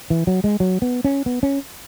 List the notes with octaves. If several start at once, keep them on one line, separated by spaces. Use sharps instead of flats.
E3
F#3
G#3
F#3
B3
C#4
B3
C#4